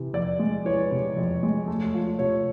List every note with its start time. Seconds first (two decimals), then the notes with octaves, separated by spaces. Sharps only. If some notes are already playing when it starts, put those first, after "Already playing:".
Already playing: C3 E3
0.13 F2 D5
0.39 G#3
0.65 E3 C#5
0.91 C3
1.17 F2
1.43 G#3
1.68 A3
1.94 F3
2.19 C3 C#5